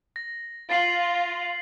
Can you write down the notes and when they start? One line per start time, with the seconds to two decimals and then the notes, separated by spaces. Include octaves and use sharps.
0.16 A#6
0.70 F4 A6 C7 F#7